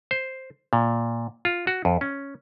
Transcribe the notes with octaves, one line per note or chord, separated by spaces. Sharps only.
C5
A#2
F4
F#4
F2
C#4